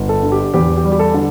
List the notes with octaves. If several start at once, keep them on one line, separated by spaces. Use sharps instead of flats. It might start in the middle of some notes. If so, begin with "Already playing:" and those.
Already playing: G1
A4
D3
G4
E2 G4
G4
G3
G4
A4
D3